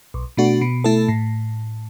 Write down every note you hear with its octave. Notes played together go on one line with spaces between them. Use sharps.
B1
B2 A3 D4 F#4
B2
A3 E4 A4
A2